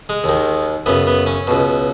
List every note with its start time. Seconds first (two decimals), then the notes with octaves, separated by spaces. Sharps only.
0.09 G#3
0.24 D#2 D#3
0.86 F#2 C#3 B3
1.07 B3
1.26 C#4
1.47 C#2 B2